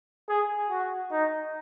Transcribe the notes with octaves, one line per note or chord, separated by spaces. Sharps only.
G#4
F#4
D#4